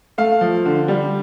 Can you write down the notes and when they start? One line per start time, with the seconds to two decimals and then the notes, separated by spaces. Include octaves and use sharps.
0.18 A3 F5
0.41 F3
0.66 D3
0.88 G3